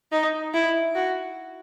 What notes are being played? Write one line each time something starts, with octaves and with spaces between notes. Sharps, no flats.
D#4
E4
F#4